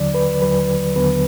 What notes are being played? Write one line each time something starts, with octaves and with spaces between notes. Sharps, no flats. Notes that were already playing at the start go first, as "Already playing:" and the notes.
Already playing: D#2 D3 F#3 D5
B4
D#2 D3 F#3 B4
D#2 D3 F#3 B3 B4